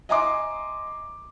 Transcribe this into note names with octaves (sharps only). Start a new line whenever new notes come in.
D#5 E5 G#5 A#5 C6 D6